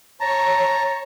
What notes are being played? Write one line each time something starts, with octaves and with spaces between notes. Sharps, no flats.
C#5 A5 A#5